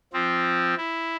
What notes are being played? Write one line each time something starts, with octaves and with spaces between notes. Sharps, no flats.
F3 C4
E4